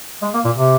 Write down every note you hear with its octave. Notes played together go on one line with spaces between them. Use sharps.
G#3
A#3
A#2
C3